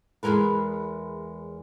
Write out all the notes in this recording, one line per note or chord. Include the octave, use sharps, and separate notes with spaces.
E2 C3 G#3 A#4 B4